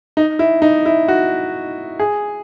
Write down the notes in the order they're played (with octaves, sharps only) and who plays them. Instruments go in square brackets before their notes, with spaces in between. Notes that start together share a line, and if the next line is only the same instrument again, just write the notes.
[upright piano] D#4
E4
D#4
E4
F#4
G#4